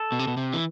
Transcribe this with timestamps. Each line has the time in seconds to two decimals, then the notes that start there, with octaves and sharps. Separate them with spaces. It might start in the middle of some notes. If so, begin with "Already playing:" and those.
Already playing: A4
0.12 B2
0.19 C3
0.27 B2
0.37 C3
0.53 E3